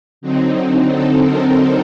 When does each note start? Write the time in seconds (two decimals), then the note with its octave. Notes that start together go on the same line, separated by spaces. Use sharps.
0.21 D3 F#3 C4 D#4
0.88 A4
1.21 A#4